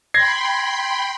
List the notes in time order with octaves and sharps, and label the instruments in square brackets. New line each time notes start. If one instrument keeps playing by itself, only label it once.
[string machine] G5 B5 C6 [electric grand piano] G#6 A#6 C7